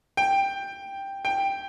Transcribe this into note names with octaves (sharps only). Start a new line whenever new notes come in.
G5
G5